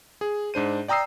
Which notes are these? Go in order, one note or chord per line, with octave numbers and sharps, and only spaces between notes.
G#4
G#2 D4 C5 D#7
D5 G5 A#5 D#6 E6 C7